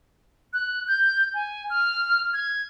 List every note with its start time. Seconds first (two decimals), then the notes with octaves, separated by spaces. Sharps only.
0.53 F#6
0.88 G6
1.34 G#5
1.70 F6
2.33 G#6